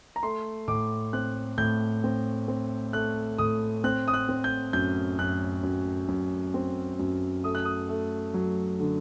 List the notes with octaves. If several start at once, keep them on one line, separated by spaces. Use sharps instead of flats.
A#5
A3 C6
A2 D6
C4 F#6
A2 G6
C4
C4
A3 F#6
A2 D#6
C4 F#6
D#6
F#6
C4
G6
F#2 G6
F#2 F#6
F#2
F#2
C4
F#2
A3 D#6
F#6
D#6
A3
F#3
D3